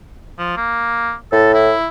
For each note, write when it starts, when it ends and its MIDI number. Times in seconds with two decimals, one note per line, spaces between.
0.38 0.53 53
0.57 1.13 58
1.32 1.72 45
1.32 1.52 69
1.54 1.88 64